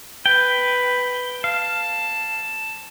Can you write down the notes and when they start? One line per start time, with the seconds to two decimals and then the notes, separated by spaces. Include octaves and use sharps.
0.26 B4 G5
1.44 F5 A5